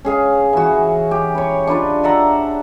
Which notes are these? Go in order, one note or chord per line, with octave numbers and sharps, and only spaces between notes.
C#4 G#4 F5
E3 F#4
G4
B4 C#5
D4 F4 B4 D5
D5 E5 F#5 A#5